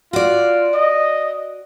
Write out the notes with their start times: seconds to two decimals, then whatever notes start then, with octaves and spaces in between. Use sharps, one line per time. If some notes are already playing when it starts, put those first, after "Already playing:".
0.13 F4 F#4 D5
0.74 D#5